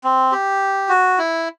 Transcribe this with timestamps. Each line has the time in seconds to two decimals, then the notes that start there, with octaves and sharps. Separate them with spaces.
0.04 C4
0.32 G4
0.89 F#4
1.18 E4